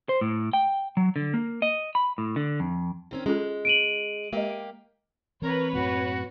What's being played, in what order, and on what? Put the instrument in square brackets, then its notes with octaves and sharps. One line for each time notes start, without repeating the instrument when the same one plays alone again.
[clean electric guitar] C5
A2
G5
F#3
D3
A#3
D#5
B5
A2
D3
F2
[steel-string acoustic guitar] D#3 C4 C#4
[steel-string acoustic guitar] G#3 [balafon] C#4 F4 A4
[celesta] D7 D#7 F#7
[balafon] G#3 D#5 [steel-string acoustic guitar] A#3 G4
[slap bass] E3 [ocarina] C4 [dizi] A#4 [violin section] B4 C#5
[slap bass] F#2 A2 A#3 [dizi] F#4